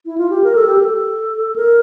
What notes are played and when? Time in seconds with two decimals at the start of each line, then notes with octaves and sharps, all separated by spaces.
0.06 E4
0.18 F4
0.30 G4
0.44 A#4
0.56 A4
0.67 G4
0.78 A4
1.56 A#4